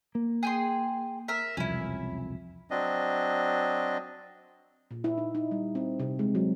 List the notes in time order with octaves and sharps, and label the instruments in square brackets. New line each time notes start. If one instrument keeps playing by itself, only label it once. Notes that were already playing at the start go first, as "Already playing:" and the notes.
[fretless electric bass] A#3
[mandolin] G#4 G5 C6
A#4 E5
[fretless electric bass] E1 C2 F2 [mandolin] C#4 E4
[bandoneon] F#3 C4 D4 D#5
[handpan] A#2
E4
D#4
D#4
G3
C4
C3
G#3
F#3